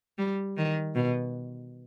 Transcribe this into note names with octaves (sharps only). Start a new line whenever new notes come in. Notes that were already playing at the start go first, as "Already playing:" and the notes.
G3
D#3
B2